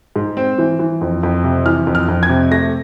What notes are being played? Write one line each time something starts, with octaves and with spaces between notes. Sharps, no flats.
G#2
C4
E3
E3
F2
F2
C3
E3 F6
F2
F6
F2
G#6
C3
A3 A#6